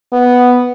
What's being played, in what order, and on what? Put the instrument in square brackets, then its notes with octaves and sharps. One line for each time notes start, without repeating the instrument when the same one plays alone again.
[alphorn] B3